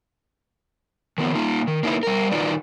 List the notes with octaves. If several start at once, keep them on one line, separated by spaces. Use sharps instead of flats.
D#3 F3 B3
A#3 D#4 F4
D#3
A#3 D#4 E4 B4
G3 A#4
D#3 D#4 F4 F#4 B4 D5